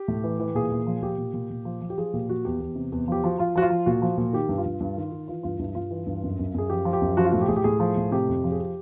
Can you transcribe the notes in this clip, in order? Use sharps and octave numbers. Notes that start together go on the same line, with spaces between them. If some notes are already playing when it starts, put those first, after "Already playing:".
Already playing: G4
A2
E3
E3
A#2 G#4
A#2
F3
A#2 G4
A#2
A#2
A#2
F3
F3
G4
F3 G#4
A#2 G4
F3 F#4
E2 G4
E2
C3
E2
F3 G4
F3 F#4
F3 F4
F3 F#4
F4
F3
A#2 F#4
F3
A#2
D#3 G4
G2
F4
G2
G2
D#3
D#3
E3 F4
G2 F4
G2 E4
G2 F4
E3
G2
F#2
F#2
F#2 G#4
F3 G4
F3
G4
F#2
F3 F#4
F4
A2 F#4
G4
A2 G#4
G4
A2 G#4
F3
A2
C3 G4
F2
F3
G#4
G4